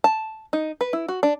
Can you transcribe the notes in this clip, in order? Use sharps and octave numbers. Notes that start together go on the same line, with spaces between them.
A5
D#4
B4
E4
F#4
D4